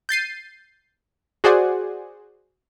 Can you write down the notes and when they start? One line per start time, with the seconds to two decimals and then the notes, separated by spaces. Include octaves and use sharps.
0.09 G6 A6 C7 D#7
1.44 F#4 G#4 C5 D5 F#5 G#5